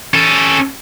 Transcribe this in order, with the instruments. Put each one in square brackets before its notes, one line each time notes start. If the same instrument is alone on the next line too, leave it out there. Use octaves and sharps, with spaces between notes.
[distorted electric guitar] C#4 A4